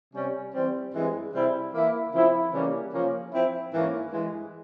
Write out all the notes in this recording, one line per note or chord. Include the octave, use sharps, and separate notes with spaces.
C3 G3 C#4
E3 G3 C4
G2 E3 G#3 C4
C3 G3 C4 E4
E3 A#3 E4
C#3 F3 C4 E4
C#3 E3 G3 A#3 C#4
C#3 F3 A#3 C#4
F3 C4 E4
G#2 E3 A#3 C#4 E4
G2 E3 G#3